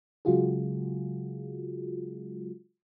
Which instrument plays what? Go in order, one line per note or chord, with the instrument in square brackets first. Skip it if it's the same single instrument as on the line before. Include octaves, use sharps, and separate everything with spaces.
[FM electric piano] C#3 F#3 G#3 F4 F#4 G#4